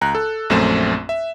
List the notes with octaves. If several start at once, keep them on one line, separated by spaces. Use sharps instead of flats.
C#2 A#5 F#6
A4
A#1 F#2 A3 C4 E7
E5